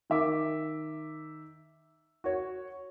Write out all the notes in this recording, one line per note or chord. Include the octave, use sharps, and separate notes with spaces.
D#3 E5 D6
F#4 C#5